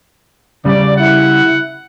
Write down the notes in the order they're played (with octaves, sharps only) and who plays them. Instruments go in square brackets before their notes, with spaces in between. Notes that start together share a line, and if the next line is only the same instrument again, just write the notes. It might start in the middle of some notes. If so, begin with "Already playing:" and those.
[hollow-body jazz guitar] C#3 G3 [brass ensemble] D5
[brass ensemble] E4 F#5